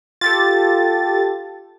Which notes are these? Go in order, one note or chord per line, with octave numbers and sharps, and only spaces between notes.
F4 G4 A4 A6